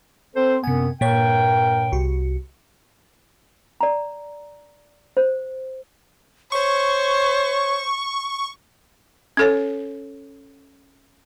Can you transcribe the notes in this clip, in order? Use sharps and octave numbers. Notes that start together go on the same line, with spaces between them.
C4 A4 C5
F#2 C3 B3 G#5
G2 A#2 A#4 C#5 G5
C2 F#4
D5 A#5
C5
C5 C#5 C#6
C#4 A4 C#5